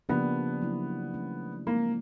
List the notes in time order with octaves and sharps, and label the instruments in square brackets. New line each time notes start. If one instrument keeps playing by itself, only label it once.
[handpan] C#3 F3 A#3 D4 G4 [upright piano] B3
[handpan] C#3 F#3 A#3 C#4 E4
E3 A3 C#4
[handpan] F3 G#3 C4 E4 [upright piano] A#3